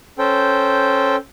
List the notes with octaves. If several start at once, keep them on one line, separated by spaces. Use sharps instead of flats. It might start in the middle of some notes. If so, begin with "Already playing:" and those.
C#4 A4 C5 G5